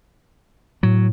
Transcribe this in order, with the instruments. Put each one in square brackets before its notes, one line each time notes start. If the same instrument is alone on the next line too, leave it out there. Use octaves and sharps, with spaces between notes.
[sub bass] A2 [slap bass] F#3